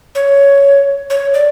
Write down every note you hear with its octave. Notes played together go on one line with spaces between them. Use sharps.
C#5
C#5
D5